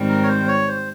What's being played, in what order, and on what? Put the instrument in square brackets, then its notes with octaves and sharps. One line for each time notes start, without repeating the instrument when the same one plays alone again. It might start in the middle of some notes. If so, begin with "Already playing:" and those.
Already playing: [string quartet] G#2 D#3 G3 C4
[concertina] A#4
C#5
C5
C#5
C5